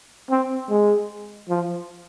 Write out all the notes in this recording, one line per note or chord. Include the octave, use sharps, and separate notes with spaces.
C4
G#3
F3